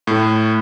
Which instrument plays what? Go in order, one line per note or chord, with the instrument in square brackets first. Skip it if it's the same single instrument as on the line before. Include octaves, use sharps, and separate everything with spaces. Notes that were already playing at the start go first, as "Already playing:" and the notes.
[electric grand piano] A2